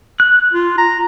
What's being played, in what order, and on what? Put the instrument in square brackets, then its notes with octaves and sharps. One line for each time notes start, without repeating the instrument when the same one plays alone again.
[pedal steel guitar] F#6
[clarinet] F4
A#5